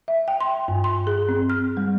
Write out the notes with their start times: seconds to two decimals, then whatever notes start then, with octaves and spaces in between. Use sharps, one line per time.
0.08 E5
0.28 G5
0.41 C6
0.68 G2
0.84 C6
1.07 G#4
1.29 C4
1.50 F6
1.77 G3